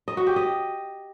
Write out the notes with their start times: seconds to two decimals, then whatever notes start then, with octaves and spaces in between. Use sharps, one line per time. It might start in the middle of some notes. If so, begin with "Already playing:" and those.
0.08 D#5
0.17 F#4
0.27 G4
0.36 D#5